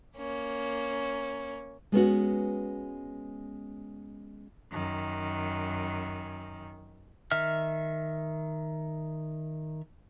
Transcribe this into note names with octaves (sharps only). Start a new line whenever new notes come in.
A#3 C#4
G#3 B3 C#4 F#4
F#2 D#3
D#3 E5 F6